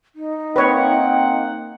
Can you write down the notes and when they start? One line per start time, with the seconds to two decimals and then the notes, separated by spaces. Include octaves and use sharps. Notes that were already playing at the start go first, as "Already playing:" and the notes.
0.16 D#4
0.56 A#3 C4 B4 C#5 F#5 G5